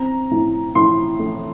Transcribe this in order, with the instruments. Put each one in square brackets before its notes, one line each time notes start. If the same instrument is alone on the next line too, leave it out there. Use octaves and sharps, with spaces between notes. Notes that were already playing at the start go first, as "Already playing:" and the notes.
Already playing: [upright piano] C4 A#5
A2
A2 C6
A3